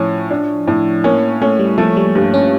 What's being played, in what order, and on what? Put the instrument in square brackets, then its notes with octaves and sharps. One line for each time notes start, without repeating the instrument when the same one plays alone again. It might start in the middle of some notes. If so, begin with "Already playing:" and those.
Already playing: [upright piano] A2 C#4 [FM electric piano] F3
[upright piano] D4
A2
[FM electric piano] A#3 [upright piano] C#4
[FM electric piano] A3 [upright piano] C#4
[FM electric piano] G3
[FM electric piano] F3 [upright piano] A3
[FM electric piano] G3
[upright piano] G2
[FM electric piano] C#4